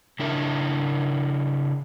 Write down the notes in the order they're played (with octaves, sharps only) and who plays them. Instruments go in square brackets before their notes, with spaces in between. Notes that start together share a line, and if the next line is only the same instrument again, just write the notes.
[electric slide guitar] C#3 D4 E4 A#4